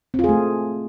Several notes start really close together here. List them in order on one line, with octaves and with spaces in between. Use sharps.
C4 F4 G#4 A3